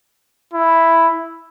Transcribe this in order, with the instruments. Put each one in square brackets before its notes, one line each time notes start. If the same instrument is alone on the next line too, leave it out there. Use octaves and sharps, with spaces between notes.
[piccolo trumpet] E4